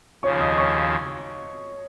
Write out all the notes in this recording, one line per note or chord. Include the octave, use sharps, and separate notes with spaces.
D#2 C#3 F3 C#5 C#6
D#5 D#6
C#5 C#6